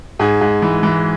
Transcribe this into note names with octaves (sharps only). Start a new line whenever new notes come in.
G#2 G#4
G#2
E3
E3